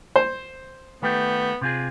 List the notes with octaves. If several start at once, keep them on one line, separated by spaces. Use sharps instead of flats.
C5
D#3 A3 B3 G4
C3 F4 G#4